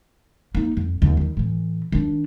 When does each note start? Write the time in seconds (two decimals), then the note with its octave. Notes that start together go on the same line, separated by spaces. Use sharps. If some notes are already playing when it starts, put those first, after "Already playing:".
0.55 A#3 D#4
0.77 F2
1.02 D#2 C#3
1.17 D#3 G3
1.37 A2 E3
1.92 D#3 D4